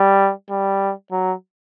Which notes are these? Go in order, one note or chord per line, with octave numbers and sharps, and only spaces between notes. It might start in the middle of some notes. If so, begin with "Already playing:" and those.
Already playing: G3
G3
F#3